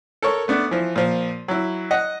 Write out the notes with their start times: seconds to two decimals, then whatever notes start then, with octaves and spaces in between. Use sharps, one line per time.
0.22 A4 A#4 C#5
0.48 A3 B3 D4
0.71 E3 F3
0.96 A#2 F3
1.48 F#3 E4
1.91 D#5 F#5